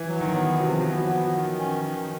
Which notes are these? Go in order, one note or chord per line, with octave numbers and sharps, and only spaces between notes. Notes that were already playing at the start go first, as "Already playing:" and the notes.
Already playing: E3
F#3
D#3
B3
C3 F#3
F3
F#3 B3
F3
B3
D#3
C#4
D#3